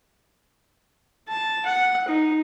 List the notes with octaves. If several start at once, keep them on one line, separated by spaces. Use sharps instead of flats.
A5
F#5
D#4